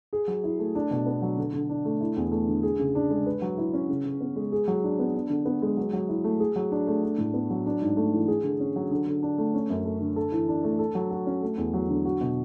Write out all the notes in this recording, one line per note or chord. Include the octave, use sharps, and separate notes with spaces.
G#4
F#3
E4
A3
D4
B2
B3
F#3
D3
D3
D4
A3
E4
E2
A3
D3
G#4
C#3
D4
G#3
B4
F#3
E4
C#4
C#3
C#3
B3
G#3
G#4
F#3
D4
B3
D4
D3
B3
G#3
F#3
F#3
E4
A3
G#4
F#3
D4
A3
D4
A2
B3
F#3
D4
G#2
A3
E3
G#4
D3
C#4
F#3
D3
D3
D4
A3
C#4
F#2
A3
D3
A4
E3
D4
A3
A4
F#3
F#4
C#4
A3
E2
F#3
D3
F#4
B2